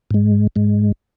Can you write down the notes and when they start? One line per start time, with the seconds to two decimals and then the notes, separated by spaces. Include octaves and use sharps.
0.11 G#2 G#3
0.56 G#2 G#3